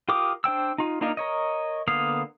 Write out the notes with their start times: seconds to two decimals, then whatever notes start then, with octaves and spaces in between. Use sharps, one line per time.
0.09 F4 G4 A#4 D6 D#6
0.44 D4 C5 G5 E6
0.78 D#4 F4
1.01 A#3 D4 D#4 F4 A#4
1.17 A#4 C#5 D#5
1.88 D3 A#3 B3 F5 D#6